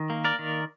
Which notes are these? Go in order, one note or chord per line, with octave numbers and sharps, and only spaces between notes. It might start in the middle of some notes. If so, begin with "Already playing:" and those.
Already playing: D#3
A#3
A#4 D5
D#3